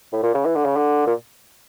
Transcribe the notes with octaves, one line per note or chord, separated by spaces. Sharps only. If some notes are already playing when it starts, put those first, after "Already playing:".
A2
A#2
C#3
E3
D3
C#3
D3
A#2